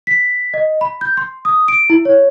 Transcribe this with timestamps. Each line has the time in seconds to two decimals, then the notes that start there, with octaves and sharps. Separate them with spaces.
0.07 B6
0.54 D#5
0.81 B5
1.01 G6
1.17 C6
1.45 D#6
1.68 D7
1.90 E4
2.05 C#5